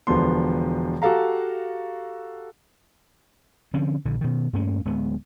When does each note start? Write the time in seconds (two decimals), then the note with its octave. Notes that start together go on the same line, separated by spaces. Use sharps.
0.07 E1 D3 F3 B3 C6
1.02 F#4 G4 A4 F5 A#5
3.74 D3 F3 C4 C#4
4.05 A#1 D3
4.21 B2 D#3
4.53 G2 A3 A#3 C#4
4.85 D1 G#3 B3